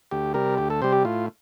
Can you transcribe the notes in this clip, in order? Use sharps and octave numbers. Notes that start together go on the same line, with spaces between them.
D2 G4
C3 G3 A#4
D2 G4
A4
C3 G3 C5
G4
A2 F4